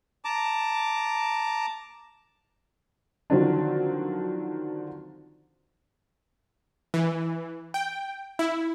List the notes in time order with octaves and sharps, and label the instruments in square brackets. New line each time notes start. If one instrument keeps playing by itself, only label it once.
[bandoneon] A5 A#5 D6
[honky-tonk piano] D3 D#3 F3 F#3 C4 D4
[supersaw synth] E3
G5
E4